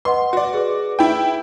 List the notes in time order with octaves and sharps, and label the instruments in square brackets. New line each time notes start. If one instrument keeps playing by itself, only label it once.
[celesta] B4 D#5 F#5 [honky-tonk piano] C6
[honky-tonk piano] F#4 D5
[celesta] G#4 B4
[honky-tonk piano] E4 G5